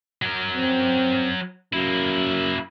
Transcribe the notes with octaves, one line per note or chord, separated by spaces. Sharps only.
F#3 A#4
C4
F#2 A#3 E4